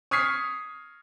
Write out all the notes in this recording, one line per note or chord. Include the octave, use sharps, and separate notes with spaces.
C#6 D#6 F6 G#6 B6 C7